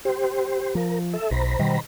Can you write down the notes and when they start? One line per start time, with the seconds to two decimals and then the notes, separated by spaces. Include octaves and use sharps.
0.05 G4 C5
0.75 F3 A#4
1.13 A4 E5
1.31 B1 C5 A#5 B5
1.59 B2 D#3 G3